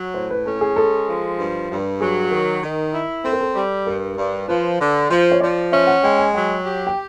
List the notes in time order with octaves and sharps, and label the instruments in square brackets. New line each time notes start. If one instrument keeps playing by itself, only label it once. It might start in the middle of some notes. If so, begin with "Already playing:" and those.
Already playing: [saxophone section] F#3
[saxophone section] A2 [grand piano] C5
[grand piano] B4
[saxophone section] C#4 [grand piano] A4
[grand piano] G#4
[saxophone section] G#3 [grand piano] A4
[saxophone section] F3
G2
G2
[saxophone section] F#3 [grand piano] G#4
[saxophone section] D#3 [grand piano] A#4
[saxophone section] D#3
E4
[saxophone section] C4 [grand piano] A4
[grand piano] A#4
A4
[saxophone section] G3
[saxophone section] G2 [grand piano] A#4
[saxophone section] G2
[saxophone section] F3 [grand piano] B4
[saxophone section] D3
[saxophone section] F3 [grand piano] C5
[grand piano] C#5
[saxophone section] F3 [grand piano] D5
[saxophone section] C#4 [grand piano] E5
[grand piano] F#5
[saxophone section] G#3 [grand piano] G5
[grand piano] G#5
[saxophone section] F#3 [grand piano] G5
[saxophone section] G4
[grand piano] G5